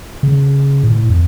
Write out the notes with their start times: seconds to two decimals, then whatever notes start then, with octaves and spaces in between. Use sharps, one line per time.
0.23 C#3
0.83 A2
1.10 F2